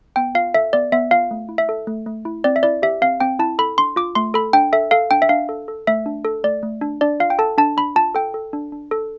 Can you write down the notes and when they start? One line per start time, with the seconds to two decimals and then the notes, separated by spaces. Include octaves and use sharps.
0.16 B3 G5
0.35 F4 F5
0.54 A4 E5
0.73 B3 D5
0.92 B3 E5
1.11 F4 F5
1.31 A3
1.49 E4
1.58 E5
1.69 A4
1.87 A3
2.06 A3
2.25 E4
2.44 C4 D5
2.56 E5
2.63 E4 D5
2.82 G4 E5
3.02 C4 F5
3.20 C4 G5
3.39 E4 A5
3.59 A4 B5
3.78 D4 C6
3.96 F4 D6
4.15 A3 C6
4.34 A4 B5
4.53 D4 G5
4.73 A4 E5
4.91 A4 F5
5.11 D4 G5
5.22 E5
5.29 D4 F5
5.49 A4
5.68 A4
5.87 A3 E5
6.06 D4
6.25 A4
6.44 A3 D5
6.63 A3
6.81 D4
7.01 D4 D5
7.20 F4 F5
7.30 G5
7.39 A4 A5
7.58 D4 A5
7.77 D4 B5
7.96 F4 A5
8.15 A4 G5
8.34 A4
8.53 D4
8.72 D4
8.91 A4